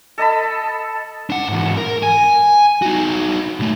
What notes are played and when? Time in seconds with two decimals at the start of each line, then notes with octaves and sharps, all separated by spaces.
0.18 A4 D#5 A5 B5
1.30 D4 F#5
1.49 G#2 E3
1.77 A#4
2.03 G#5
2.82 D#4 F#4
3.60 B1 A3